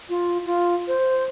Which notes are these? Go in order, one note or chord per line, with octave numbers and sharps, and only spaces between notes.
F4
F4
C5